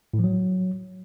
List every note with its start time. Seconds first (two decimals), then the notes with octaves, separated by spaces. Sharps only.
0.14 A2
0.19 F3
0.24 F#3